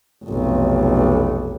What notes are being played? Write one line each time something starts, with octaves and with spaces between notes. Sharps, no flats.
F1 B1